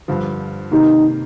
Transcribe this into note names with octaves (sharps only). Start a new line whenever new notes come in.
G2 D3 F3
C3 D#3 A#3 D#4